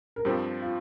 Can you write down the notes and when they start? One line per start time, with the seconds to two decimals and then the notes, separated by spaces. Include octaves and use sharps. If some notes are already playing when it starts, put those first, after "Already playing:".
0.16 A#4
0.25 G2 F3 C4 G4
0.62 F4